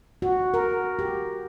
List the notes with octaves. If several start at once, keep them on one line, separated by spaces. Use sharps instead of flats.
F#4
A#4
G4